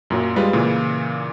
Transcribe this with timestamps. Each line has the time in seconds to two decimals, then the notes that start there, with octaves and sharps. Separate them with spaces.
0.10 F#2 A#2 F#3
0.36 G3 G#3 F4 B4
0.53 A#2 C#3 E3